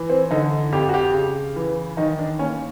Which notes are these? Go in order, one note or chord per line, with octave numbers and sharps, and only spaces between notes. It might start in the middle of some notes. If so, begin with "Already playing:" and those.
Already playing: E3
C4
D3 D#4
F2 G4
F#4
G4
C#3
E3
D#3 D#4
D4
A#3 C#4